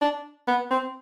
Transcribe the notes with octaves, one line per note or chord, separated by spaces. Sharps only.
D4
B3
C4